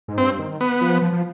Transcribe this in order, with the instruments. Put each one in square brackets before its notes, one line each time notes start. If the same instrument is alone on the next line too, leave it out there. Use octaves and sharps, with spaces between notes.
[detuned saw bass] G#2
[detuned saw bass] G2 [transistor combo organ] C4
[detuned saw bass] D#3
[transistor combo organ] B3
[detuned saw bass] F3
F3
F3